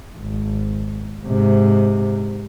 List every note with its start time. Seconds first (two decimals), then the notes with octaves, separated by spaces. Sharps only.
0.19 G#1
1.27 G#2 C3